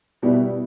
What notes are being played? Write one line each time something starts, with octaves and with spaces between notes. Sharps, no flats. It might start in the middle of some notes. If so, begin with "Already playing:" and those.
B2 G3 B3 E4